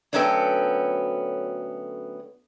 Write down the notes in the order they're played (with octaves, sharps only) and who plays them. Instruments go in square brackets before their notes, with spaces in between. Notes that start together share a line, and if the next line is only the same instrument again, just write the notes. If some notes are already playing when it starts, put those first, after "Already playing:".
[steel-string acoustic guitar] D2 F#3 B3 C#4 A4 G5